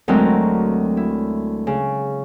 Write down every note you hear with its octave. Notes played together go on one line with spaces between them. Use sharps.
D2 F#3 G#3 C4 A#4 A#5
E4
C#3